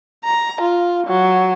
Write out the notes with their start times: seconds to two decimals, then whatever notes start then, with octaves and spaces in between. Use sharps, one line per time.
0.24 A#5
0.61 F4
1.07 F#3